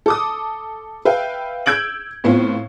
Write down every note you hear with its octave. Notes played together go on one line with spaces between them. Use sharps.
A4 D6 D#6
B4 E5 F5 G5
E6 G6 G#6 D7 F#7
A2 B3 C4 F4